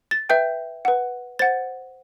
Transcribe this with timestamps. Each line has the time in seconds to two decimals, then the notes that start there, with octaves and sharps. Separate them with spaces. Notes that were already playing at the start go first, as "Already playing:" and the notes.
0.11 A6
0.29 B4 E5 G5 G6
0.85 B4 F#5
1.39 C5 F#5 A6